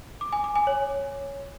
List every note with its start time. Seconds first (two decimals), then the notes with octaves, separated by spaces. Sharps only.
0.21 D6
0.33 G#5
0.44 D6
0.56 G#5
0.67 C#5